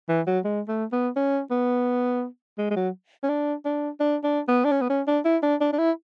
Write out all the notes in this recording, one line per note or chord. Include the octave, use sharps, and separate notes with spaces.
E3
F#3
G#3
A3
B3
C#4
B3
G#3
G#3
F#3
C#4
D4
D4
D4
D4
B3
D4
C#4
B3
C#4
D4
E4
D4
D4
D4
E4